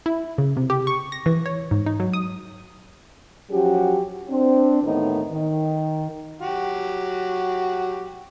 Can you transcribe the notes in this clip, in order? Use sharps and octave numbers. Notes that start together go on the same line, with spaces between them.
E4
C#3
C3
G4
C#6
A#6
E3
C#5
G#2
D#4
F#3
D#6
F3 F#3 C#4 F#4 G4
C4 D4
D#2 A2 D#3 E3 B3 D#4
D#3
F#3 F#4 G4